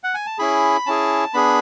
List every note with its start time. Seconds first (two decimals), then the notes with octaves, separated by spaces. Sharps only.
0.04 F#5
0.15 G#5
0.26 A5
0.39 C#4 E4 G#4 B5
0.86 C#4 E4 G#4 A5
1.34 B3 D4 G#4 B5